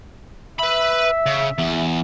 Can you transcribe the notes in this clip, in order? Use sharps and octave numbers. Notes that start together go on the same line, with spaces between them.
B4 E5 B5
C#3
E2